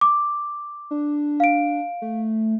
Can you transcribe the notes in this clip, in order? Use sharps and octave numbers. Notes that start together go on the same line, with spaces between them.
D6
D4
F5 D7
A3